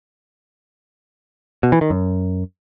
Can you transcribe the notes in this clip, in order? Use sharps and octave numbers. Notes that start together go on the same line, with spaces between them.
B2
E3
D#3
F#2